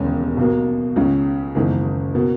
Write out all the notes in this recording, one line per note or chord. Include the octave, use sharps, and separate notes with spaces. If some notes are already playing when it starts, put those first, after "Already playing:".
Already playing: E1 D#2 C#3 G#3 C#4
B1 B2 A#3
C#2 C#3 G#3 C#4
F#1 E2 D#3 G#3
B2 A#3